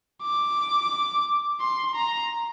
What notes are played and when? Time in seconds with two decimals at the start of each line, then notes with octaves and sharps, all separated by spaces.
0.22 D6
1.60 C6
1.95 A#5